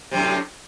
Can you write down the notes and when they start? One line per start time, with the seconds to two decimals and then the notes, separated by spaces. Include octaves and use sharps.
0.11 C3
0.14 F#2
0.17 A2